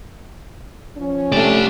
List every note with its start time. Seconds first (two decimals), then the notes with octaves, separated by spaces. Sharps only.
0.97 F3 C#4
1.32 G3 A3 C4 D4 D5